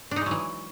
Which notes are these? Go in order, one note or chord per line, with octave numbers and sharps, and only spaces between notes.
E3 F#3 G#3 D4 D#4